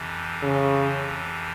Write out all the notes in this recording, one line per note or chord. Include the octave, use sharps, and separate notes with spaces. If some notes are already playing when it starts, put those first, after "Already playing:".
Already playing: F2 C3 E3
C#3